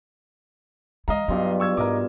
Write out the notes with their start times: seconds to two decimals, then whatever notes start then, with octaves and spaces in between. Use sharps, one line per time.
1.08 E3 G#3 D#5 F5 A#5
1.28 G2 B2 F#3 F4
1.60 C#6 E6 G#6
1.77 G#2 A#4 D#5 D6